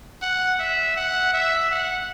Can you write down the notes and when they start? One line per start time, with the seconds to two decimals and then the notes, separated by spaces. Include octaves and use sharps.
0.22 F#5
0.59 E5
0.97 F#5
1.33 E5
1.71 F#5